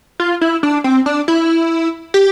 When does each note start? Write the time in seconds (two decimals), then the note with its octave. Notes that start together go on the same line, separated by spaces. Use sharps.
0.20 F4
0.41 E4
0.63 D4
0.84 C4
1.06 D4
1.28 E4
2.14 G4